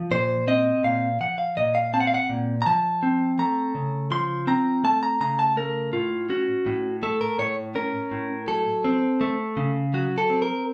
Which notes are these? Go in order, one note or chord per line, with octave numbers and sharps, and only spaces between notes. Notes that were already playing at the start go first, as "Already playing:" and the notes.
Already playing: F3
A#2 C5
C4 D#5
A#2 F5
F3 F#5
F5
A#2 D#5
F5
C4 A5
F#5
F5
F#5
A#2
A#5
F3 A5
C4
A3 A#5
C#3
F3 C6
C4 A#5
A3 A5
A#5
C#3 A#5
A5
A3 A#4
A2 F4
C#4 F#4
A2
A3 A4
A#4
A2 C#5
C#4 A#4
A2
F#3 A4
C4
A3
C#3
F#3 F#4
A4
C4
A#4